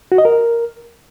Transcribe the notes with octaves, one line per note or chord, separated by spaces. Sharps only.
F#4
D#5
A#4